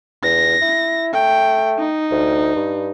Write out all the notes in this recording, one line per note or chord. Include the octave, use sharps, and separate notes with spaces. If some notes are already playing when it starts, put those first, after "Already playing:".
E2 A#6
E4
A3 G5
D#4
D2
G2